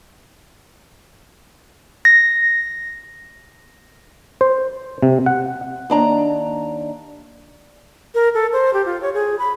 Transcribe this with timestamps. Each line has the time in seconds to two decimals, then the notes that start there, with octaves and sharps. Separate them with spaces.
2.05 A#6
4.41 C5
5.03 C3
5.26 F#5
5.90 D#2 D4 A#5
8.15 A#4
8.34 A4
8.53 C5
8.74 G4
8.86 F4
9.02 C#5
9.14 G#4
9.39 B5